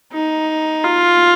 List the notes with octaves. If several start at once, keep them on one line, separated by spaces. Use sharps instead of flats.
D#4
F4